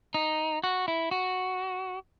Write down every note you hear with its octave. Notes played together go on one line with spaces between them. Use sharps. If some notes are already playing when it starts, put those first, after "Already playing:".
D#4
F#4
E4
F#4